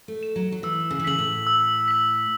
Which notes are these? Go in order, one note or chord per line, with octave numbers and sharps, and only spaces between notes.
A3
E7
F#3
F#3
E3 E6
C#3
E3
C#3 B6 F#7
A2
E6
B6 F#7